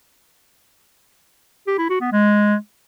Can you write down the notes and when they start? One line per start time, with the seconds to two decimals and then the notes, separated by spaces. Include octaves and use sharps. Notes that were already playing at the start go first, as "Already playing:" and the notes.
1.67 G4
1.79 E4
1.90 F#4
2.01 B3
2.12 G#3